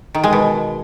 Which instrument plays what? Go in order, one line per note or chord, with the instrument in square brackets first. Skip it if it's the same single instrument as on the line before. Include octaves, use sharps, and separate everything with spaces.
[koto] D#3
G#3
B2